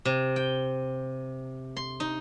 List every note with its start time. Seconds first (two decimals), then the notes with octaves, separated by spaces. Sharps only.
0.05 C3
0.36 G5
1.77 C6
2.00 D#4